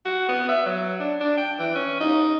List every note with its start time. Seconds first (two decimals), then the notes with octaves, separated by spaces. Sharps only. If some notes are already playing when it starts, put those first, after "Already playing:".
0.05 F#4
0.28 B3
0.49 E5
0.66 F#3
1.00 D4
1.20 D4
1.37 G5
1.59 E3
1.75 C#4
2.00 D#4